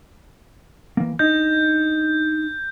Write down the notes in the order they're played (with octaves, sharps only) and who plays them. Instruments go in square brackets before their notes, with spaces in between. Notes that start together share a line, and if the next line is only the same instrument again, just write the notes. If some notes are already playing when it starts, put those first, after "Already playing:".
[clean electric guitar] E3 A#3
[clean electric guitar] D4 D#4 D#5 [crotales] G6